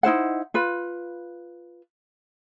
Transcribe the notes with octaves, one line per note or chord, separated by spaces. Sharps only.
D#4 E4 C5 F#5
F4 B4